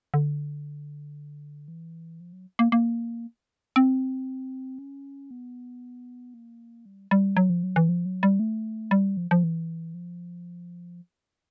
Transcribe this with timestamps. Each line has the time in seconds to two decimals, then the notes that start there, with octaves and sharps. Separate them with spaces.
0.14 D3
1.68 E3
2.20 F3
2.33 F#3
2.59 A#3
2.72 A#3
3.76 C4
4.79 C#4
5.31 B3
6.34 A#3
6.86 G3
7.11 G3
7.37 F#3
7.50 F3
7.63 F#3
7.76 E3
7.89 F3
8.06 F#3
8.23 G3
8.40 A3
8.91 G3
9.17 F3
9.31 F3
9.44 E3
9.94 F3